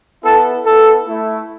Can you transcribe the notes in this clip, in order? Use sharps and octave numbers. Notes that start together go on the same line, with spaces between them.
B3 E4 A4
B3 E4 A4
A3 E4